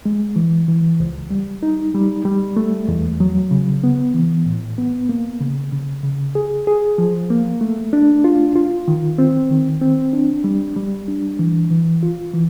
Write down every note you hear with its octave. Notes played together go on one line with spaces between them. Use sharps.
G#3
E3
E3
C#2
G3
D#4
G3
G3
A3
E2
F#3
C#3
B3
E3
A2
B3
A#3
C#3
C#3
C#3
G#4
G#4
F3
A#3
A3
D4
F4
F4
D#3
C4
D#3
C4
D4
G3
G3
D4
E3
E3
F4
E3